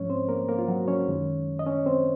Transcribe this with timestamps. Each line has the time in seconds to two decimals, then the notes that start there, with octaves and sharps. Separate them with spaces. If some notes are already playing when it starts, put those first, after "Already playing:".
Already playing: G#2 F3 G#3 C#4 C#5
0.10 C4 C5
0.29 A#3 A#4
0.48 A#3 A#4
0.59 F4
0.68 F#3 F#4
0.88 C#4 C#5
1.08 F#2 D#3 G#3
1.59 D#5
1.67 C#4 C#5
1.86 C4 C5